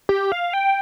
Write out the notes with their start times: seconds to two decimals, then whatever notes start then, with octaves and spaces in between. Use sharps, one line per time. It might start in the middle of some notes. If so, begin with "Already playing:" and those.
0.09 G4
0.32 F5
0.53 G5